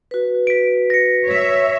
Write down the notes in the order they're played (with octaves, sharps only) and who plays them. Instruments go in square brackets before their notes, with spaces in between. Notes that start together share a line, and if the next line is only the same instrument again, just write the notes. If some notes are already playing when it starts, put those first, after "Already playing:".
[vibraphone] F#4 B4
[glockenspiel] B6 D7
A#6 C#7
[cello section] C#5 E5